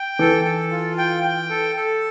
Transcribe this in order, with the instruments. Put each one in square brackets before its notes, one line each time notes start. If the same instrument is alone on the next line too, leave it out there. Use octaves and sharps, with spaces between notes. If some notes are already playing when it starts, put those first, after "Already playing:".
Already playing: [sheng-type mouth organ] G5
[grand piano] E3 [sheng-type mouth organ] A4
[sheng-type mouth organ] A4
F4
G5
G5
A4
A4